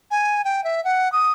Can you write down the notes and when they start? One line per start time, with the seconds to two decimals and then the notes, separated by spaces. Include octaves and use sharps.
0.11 G#5
0.45 G5
0.64 E5
0.84 F#5
1.12 D#6